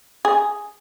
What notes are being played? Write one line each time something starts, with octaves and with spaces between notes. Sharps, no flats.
G#4